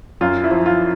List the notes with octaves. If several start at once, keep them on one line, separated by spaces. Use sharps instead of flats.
F#2 F4
E4
F3
F4